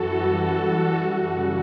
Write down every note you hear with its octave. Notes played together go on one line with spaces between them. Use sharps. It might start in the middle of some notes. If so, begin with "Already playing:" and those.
Already playing: F#2 E3 F#4 A4
G3
F#2
E3 F#4 A4
C#3